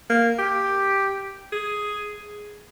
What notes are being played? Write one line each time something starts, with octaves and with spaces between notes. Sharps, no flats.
A#3
G4
G#4